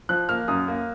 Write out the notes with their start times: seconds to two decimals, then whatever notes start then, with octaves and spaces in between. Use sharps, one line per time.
0.09 F3 F#6
0.29 A#3 F6
0.48 F#2 D#6
0.68 A#3